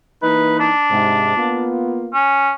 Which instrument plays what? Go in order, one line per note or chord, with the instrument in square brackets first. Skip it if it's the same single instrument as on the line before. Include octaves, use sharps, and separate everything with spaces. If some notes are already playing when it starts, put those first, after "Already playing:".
[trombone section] E3 A#3 D#4 [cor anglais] B4
[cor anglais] D4
[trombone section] G#2 C3
A#3 B3 F4
[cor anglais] C#4